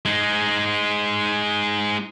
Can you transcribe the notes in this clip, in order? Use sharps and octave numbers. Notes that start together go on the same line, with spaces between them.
G#3 D#4